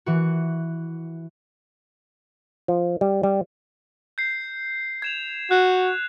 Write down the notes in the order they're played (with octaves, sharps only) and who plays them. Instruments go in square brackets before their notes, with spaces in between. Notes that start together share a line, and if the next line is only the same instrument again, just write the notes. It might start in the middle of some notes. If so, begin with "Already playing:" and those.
[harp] E3 F#4
[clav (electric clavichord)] F3
G3
G3
[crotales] G6 C7
G#6 E7 F7
[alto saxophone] F#4 [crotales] F#6